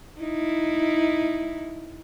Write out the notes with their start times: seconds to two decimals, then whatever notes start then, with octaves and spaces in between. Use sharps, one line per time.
0.21 D#4 E4